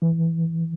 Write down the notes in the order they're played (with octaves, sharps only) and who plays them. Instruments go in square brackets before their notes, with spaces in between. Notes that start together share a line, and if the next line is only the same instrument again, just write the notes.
[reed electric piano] E3